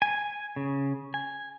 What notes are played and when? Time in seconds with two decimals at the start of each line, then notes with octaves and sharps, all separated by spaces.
0.02 G#5
0.56 C#3
1.14 G#5